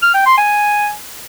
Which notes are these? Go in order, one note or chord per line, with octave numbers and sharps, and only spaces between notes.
F6
G5
C6
G#5